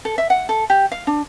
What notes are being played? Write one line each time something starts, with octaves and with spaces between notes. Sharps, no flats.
A4
E5
F#5
A4
G4
F5
D4